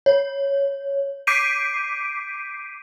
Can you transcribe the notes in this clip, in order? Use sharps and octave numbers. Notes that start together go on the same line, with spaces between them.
C#5
D6 G6 B6 C7 D7 D#7